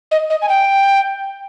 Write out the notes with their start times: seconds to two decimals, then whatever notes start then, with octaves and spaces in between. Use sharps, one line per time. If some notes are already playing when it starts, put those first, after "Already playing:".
0.11 D#5
0.30 D#5
0.42 G#5
0.49 G5